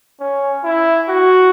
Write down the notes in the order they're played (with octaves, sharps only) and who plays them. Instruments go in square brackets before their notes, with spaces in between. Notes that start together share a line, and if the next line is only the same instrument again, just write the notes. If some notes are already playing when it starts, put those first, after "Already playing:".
[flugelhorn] C#4
E4
F#4